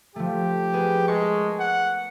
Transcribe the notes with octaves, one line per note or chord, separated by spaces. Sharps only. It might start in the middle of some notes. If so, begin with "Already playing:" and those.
F3 A3 G4
B3 G#4 B4
G#3 A#4 A5 C#6
F#5